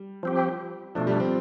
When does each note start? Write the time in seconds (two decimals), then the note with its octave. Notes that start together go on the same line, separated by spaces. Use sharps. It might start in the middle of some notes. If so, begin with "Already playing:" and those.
Already playing: G3
0.23 F3 C4 G4
0.95 B2 F3 A3 D4
1.07 G3
1.20 C4